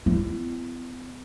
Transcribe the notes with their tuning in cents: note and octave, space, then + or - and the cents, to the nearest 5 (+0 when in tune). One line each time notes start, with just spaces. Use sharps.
B3 +45 E4 +40